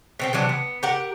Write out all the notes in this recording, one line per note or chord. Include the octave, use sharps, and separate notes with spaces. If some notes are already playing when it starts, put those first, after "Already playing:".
B2 C4 G5
C3 E3 F#3 D4
B3
G4 A#4 F#5